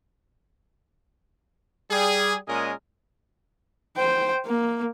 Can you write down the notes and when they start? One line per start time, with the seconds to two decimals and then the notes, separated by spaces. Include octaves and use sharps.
1.90 G3 G#4
2.48 A#2 G#3 C#4 G#4 A#4 D#5
3.97 C5 G5
4.46 A#3